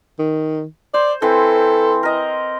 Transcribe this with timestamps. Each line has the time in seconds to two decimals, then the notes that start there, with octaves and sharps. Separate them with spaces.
0.19 D#3
0.94 C5 D5
1.22 E3 C4 A4
2.03 A#4 D#5